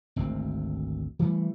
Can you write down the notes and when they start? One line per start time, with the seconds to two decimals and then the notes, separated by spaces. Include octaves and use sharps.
0.16 G#1 D2 C4
1.19 E3 G3 A3